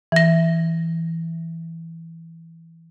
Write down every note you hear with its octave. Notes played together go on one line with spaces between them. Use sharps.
E3 A#6